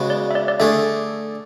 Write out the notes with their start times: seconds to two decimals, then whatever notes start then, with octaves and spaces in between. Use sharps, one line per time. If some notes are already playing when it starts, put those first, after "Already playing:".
Already playing: C#3 G#3 B3 F#4
0.10 D5
0.31 E5
0.35 D5
0.48 D5
0.60 D3 A3 D4 G#4 E5